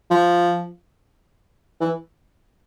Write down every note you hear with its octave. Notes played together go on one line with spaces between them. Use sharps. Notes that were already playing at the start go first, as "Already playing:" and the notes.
F3
E3